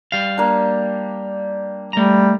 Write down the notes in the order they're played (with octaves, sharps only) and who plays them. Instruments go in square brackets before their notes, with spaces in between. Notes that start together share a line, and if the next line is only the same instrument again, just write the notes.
[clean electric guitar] G3 F5
[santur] A#3 D4
[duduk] G3 [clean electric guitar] A3 A#5